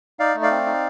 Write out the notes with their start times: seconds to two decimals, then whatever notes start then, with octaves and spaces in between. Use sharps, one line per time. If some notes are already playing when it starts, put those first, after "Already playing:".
0.19 D#4 D5 F5
0.35 A3
0.42 D5 F5
0.50 C4
0.66 D#4